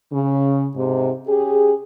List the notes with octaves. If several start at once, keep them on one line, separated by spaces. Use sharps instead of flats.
C#3
G#2 C3
C#4 G4 G#4